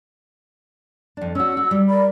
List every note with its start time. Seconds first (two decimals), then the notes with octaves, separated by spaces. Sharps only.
1.17 F2 D4
1.35 C#4 F#4 E6
1.57 F#4
1.71 G3
1.88 A#4 D5 B5